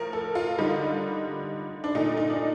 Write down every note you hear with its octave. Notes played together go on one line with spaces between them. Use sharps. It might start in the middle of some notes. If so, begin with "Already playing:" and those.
Already playing: A2 F3 A#4
A4
F4
D3 G3 D#4
D4
A#2 A3 D#4
D#4
D4